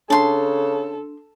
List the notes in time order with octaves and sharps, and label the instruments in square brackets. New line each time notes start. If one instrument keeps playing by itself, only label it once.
[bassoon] C#3 [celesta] D4 [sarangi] A4 [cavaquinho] A5 C6